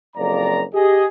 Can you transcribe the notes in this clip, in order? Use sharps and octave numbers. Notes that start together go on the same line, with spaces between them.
F#1 F2 D5 A#5
G4 G#4 D#5